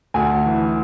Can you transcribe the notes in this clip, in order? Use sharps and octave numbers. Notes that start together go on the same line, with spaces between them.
D2 G#5
E3